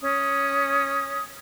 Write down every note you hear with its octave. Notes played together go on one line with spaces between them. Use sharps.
C#4 D#6